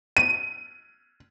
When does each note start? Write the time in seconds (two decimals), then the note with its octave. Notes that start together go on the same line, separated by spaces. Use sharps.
0.17 D#7